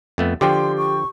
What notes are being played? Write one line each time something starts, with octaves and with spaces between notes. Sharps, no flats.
F2 A3 B3
D3 F3 G4 D5 G5 C6 D6
C#6